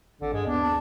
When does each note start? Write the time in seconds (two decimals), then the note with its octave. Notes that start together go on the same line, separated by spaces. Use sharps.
0.21 G#1 D3
0.33 G2 G#3
0.47 D#2 B3 D4
0.62 A5